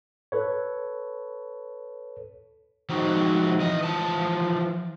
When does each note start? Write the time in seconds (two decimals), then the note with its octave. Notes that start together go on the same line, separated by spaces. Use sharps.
0.32 A4 B4 C#5
2.89 F3 F#3 G#3 C4 D#4 F#4
3.59 E3 D#5
3.81 E3 F3 A5